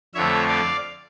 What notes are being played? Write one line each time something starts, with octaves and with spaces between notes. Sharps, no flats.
F2 D3 F3 A3 C#5 E5
D5 F5